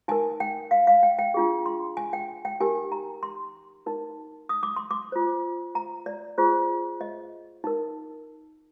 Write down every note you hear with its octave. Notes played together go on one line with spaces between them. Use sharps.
D#4 A#4 G#5
G5
F5
F5
G5
G5
D4 F4 G#4
C6
G#5
G5
G5
D#4 G4 A#4 G#5
A#5
C6
D#4 A#4
D#6
D6
C6
D6
F4 C5
A#5
D5
F4 G#4 C5
D#5
D#4 A#4